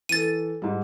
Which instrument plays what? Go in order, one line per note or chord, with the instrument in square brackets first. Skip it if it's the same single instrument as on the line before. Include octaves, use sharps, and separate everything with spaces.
[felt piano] E3 A4 [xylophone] A6 D#7
[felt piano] G#2 G3